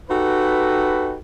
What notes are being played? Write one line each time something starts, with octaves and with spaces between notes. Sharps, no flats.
D#4 F#4 G4 A4 B4